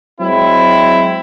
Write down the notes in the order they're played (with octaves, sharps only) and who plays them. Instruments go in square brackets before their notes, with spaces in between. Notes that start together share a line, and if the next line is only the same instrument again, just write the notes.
[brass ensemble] F#3 G#3 C4 E4